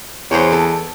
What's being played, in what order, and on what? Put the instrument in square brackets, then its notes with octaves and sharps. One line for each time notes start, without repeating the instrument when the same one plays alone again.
[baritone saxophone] E2 [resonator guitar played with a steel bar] C5 C#5
[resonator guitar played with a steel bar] A4